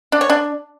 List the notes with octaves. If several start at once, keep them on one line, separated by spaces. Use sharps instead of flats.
D4
C#5
D4